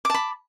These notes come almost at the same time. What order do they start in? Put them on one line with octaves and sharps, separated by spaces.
D6 A5 B5